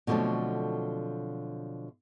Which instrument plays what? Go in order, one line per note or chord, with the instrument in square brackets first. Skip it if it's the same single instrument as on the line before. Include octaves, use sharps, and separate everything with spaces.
[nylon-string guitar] B2 D3 F3 F#3 A3 C4